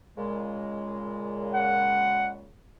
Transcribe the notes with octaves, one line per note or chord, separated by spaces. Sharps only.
A#2 C#3 G#3
F#5